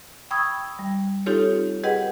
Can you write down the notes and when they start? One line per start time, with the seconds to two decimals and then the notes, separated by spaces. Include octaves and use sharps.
0.31 G5 B5 C#6 D#6 E6 G#6
0.79 G3
1.26 C4 D#4 F4 G4 A4 C#5
1.84 G4 G#4 B4 D#5 F#5 G5